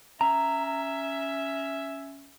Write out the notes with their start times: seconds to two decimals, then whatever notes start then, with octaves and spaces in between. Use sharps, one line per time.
0.21 C#4 E5 A#5